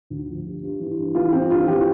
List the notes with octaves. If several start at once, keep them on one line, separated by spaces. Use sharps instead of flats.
D2
F3
G2
G2
E3
G2
E3 F4
E3 C4
G2 F4
E3 G4